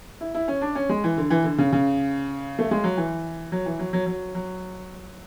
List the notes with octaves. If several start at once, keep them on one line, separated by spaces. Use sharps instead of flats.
E4
E4
C#4
D4
C#4
G#3
E3
D3
E3
D3
C#3
C#3
A3
G#3
F#3
E3
F#3
E3
F#3
F#3
F#3
F#3